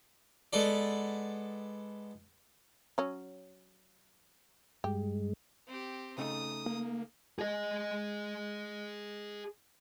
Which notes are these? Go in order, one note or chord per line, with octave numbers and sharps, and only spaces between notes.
G#3 B3 A4 D5
F#3 C#4
G2 G#3 G4
C4 G4
C#3 A3 D#4 D#6
A#3
G#4 D#5